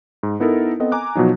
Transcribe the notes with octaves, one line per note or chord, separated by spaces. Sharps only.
G#2
B3 D#4 E4 A4 A#4
B3 C4 A4 D#5
G#5 A#5 D6 F#6
B2 F3 F#3 D#4